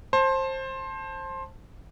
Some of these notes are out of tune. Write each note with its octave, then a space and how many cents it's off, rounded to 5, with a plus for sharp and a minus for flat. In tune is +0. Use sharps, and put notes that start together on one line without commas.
C5 +20 A5 +0